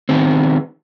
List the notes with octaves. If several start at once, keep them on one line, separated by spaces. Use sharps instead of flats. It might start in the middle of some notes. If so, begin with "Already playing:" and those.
D#3 B3 C4